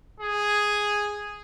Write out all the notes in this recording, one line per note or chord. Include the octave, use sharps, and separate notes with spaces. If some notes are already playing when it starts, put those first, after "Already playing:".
G#4